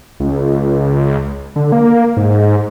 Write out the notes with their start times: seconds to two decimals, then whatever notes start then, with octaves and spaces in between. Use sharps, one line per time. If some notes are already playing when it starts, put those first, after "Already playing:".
0.20 C#2
1.56 D3
1.72 A#3
2.17 G#2